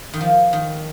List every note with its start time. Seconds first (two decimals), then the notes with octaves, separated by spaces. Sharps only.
0.14 D#3
0.21 F3
0.53 D#3